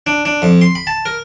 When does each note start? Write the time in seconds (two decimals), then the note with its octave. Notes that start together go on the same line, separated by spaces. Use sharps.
0.07 D4
0.25 D4
0.42 F2
0.61 C6
0.75 B5
0.87 A5
1.06 A#4